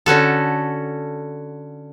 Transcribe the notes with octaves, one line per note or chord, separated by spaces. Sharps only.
D3 C#4 F#4 A4